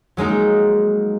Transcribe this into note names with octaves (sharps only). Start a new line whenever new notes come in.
F#3 G#3 A#3 D#4